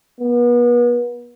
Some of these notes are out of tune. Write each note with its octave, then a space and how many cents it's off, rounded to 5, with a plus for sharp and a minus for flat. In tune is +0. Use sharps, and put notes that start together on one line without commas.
B3 -35